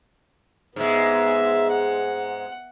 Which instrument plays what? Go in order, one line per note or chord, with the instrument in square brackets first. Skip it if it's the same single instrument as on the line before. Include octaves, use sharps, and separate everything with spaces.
[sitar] G#2 G#3 [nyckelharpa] B3 E5
[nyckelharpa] F#5